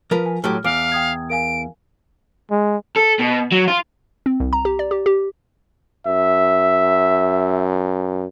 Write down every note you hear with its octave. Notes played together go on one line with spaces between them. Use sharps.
F3 A#4 B4
G#5
A2 F#3 G4 F6
E2 F5 D6 F6 D7
G5 D#6 G#6
A#4 F5 G#5 D7
G#3
A4
B2
F#3
F4
C4
C2
A#5
G4
D5
G4
G4
F#2 E5